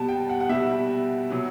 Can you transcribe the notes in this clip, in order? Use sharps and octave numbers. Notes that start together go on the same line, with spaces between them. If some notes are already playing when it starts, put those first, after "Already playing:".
Already playing: B2 G3 A5
G5
F#5
F#5
B2 G3 E5
B2 F#3